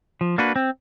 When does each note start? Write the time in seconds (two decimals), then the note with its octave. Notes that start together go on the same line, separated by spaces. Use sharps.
0.21 F3
0.38 A#3 D4 F#4 B4
0.56 C4